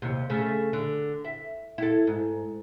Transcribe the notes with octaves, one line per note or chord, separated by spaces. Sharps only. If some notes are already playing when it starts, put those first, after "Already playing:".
D#2 C3
C#3 A3
D3
E5
E4 A4
G#2